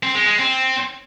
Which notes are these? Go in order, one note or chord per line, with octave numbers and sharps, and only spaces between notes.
C4
G#3
G#3
C4